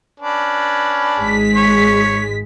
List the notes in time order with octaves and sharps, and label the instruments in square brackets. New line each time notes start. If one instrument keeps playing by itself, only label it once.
[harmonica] C#4 D4 B4
[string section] G#1 G#3 B6
[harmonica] C#5